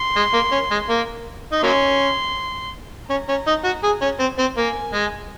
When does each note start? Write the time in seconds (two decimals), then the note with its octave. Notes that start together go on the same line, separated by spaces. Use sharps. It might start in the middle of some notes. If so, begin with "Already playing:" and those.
Already playing: C6
0.16 G#3
0.34 A#3
0.52 C#4
0.71 G#3
0.89 A#3
1.52 D#4
1.62 F#3 A#3 C#4 C6
3.10 C#4 A#5
3.29 C#4
3.47 D#4
3.64 F#4
3.84 G#4
4.02 C#4
4.20 C4
4.39 C4
4.57 A#3 G#5
4.94 G#3